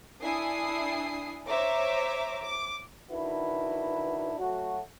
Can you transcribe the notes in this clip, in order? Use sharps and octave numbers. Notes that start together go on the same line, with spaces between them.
D4 E4 G#5 D#6 C7
C5 C#5 E5 A#5 D6
D6
D#3 D4 E4 F#4 B4
F#3 A3 F#4